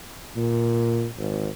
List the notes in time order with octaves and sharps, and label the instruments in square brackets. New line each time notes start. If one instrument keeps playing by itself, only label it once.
[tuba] A#2
G#1